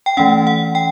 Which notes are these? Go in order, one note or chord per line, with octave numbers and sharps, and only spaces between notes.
G5
E3 A3 C#4 F#5
F#5
G5